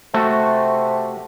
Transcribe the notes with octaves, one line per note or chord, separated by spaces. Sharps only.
C3 A3 F#4